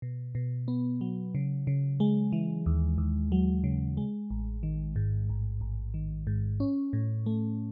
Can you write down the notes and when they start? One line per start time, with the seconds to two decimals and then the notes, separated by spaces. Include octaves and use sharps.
0.02 B2
0.35 B2
0.68 B3
1.01 F#3
1.35 C#3
1.67 C#3
2.00 G#3
2.32 E3
2.66 D#2
2.98 D#2
3.32 F#3
3.64 C#3
3.97 G#3
4.30 A1
4.63 D#3
4.96 G#2
5.29 A1
5.61 A1
5.94 D#3
6.27 G#2
6.60 C#4
6.93 A2
7.26 A3